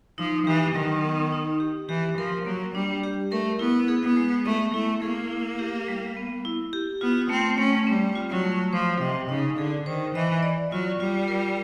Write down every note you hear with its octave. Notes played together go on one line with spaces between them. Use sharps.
F3 D#4
E3 G4
D#3 F#3
B3
D#4
G4
E3 G4
F3 A#4
F#3 A#3
G3 D4
G4
A3 A#4
B3 E4
G#4
B3
G#3
A3 B3
A3 E4
A#3 G#4
E4
G4
G3
B3
E4
G4
B3 F4
A3 C4
A3 C#4
G3 C4
F4
F#3
A3
F3 C5
C3 D#5
C#3 D#4
D3 G#4
D#3 C5
E3 D#5
D5
F#3 F4
G3 F4
A#4